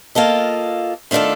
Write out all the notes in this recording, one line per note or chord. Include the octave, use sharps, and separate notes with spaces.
A#3 F4 A4 D#5
D#3 A3 D4 F4 A4